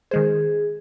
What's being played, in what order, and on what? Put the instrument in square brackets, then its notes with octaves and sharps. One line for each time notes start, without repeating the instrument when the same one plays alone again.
[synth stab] D#3 G#3 C5 [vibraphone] G#4